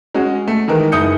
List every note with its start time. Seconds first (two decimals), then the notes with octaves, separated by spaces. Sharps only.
0.15 G#3 C#4 F#4 G#4
0.48 A3
0.68 D#3 E3 G#3 A#4
0.92 F#1 D#4 E4 D#6 G6 C#7